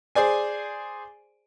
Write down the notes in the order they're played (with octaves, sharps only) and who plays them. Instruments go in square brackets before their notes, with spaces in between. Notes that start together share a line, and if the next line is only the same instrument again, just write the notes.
[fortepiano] G#4 C5 D5 G#5